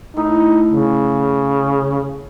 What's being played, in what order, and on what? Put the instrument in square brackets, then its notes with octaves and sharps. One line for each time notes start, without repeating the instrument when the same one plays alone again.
[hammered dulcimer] A2 [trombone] D#4
[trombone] C#3